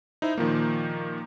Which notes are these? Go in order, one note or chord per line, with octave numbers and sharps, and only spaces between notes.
D#4 E4 C5 E5
A#2 D#3 F3 A#3